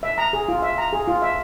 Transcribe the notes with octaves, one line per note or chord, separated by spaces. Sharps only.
E5
A#5
G#4
F4
E5
A#5
G#4
F4
E5